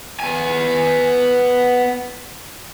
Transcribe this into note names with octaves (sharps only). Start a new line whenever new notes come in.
B3 G#5